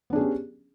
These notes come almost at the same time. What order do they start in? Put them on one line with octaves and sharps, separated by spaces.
B3 D4 G#4 C#4 G4